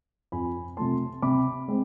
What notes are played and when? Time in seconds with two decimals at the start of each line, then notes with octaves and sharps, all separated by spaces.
0.32 F2 G#5 B5
0.77 C3 F3 A3 A5 C6
1.22 C3 B5 D6
1.68 G#3 C4